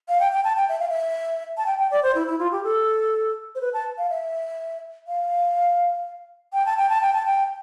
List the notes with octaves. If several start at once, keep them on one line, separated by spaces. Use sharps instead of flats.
F5
G5
G5
A5
G5
E5
F5
E5
A5
G5
G5
D5
C5
E4
E4
F4
G4
A4
C5
B4
A5
F5
E5
F5
G5
A5
G5
A5
G5
A5
G5